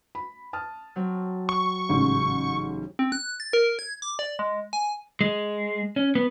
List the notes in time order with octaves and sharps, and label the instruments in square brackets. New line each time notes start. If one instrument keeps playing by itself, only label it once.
[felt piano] B5
A5 D#6 F6
[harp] F#3 C4
[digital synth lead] C#6
[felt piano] A1 G#2 C#3
[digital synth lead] C4
F#6
A6
A#4
G#6
D6
D5
G#3
G#5
[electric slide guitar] G#3
C#4
B3